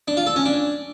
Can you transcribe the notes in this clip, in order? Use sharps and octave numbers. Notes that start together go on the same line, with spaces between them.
D4
F4
A4
C#4
D4